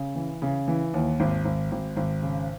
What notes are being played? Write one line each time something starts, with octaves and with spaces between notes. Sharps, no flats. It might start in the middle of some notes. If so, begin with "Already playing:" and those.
Already playing: C#3
E3
C#3
E3
D#2
G#1
G#1
G#1
G#1
C#3